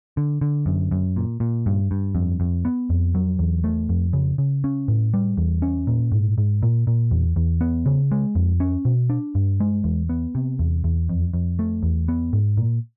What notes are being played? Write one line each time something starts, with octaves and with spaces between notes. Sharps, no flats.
D3
D3
F#2
F#2
A#2
A#2
G2
G2
F2
F2
B3
F2
F#3
E2
A3
F2
C#3
C#3
C#4
A2
G3
E2
C#4
A#2
G#2
G#2
A#2
A#2
E2
E2
B3
C#3
G#3
F2
C#4
B2
D4
G2
G#3
E2
B3
C3
E2
E2
F2
F2
A3
E2
B3
G#2
A#2